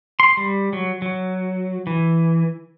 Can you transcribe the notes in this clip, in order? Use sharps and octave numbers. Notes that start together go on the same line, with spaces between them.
C6
G3
F#3
F#3
E3